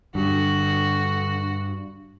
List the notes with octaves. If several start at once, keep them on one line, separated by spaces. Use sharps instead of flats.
G2 D3 F#4